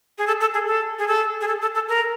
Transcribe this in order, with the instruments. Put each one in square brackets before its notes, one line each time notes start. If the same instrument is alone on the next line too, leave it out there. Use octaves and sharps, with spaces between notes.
[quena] G#4
A4
A4
G#4
A4
G#4
A4
G#4
A4
A4
A4
A#4